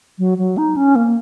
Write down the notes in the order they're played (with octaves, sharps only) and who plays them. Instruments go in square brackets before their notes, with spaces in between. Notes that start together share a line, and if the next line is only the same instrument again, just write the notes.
[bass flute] F#3
F#3
D#4
C#4
A#3